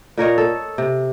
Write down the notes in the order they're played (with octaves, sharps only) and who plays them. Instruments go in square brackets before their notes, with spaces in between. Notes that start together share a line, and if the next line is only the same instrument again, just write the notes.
[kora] A#2 A#4 C#5 D#5
A4
C3